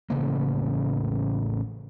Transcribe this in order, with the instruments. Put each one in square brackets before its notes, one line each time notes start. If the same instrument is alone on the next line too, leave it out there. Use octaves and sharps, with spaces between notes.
[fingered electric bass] A1 C#3 A#3